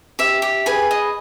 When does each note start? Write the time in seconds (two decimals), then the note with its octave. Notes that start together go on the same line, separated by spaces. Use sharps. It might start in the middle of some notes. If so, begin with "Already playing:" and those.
0.19 G4 E5
0.42 G4
0.66 G#4 B4 G#5
0.91 D#5